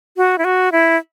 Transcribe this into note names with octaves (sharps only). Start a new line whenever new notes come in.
F#4
E4
F#4
E4